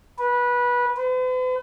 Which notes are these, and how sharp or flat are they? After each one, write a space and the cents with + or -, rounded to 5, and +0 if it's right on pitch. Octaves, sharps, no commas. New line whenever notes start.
B4 -20
B4 +45